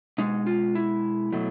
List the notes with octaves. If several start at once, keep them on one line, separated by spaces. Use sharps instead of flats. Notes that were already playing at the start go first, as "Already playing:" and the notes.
B2 G#3 D#4
F4
E4
B2 F#3 A3